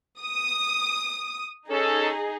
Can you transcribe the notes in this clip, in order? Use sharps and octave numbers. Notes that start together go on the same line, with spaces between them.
D#6
C#4 D#4 G#4 A4